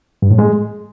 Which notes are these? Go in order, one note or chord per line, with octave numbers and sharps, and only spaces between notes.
G2
A2
G#3